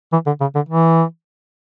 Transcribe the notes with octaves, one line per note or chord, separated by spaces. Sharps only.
E3
D3
C#3
D3
E3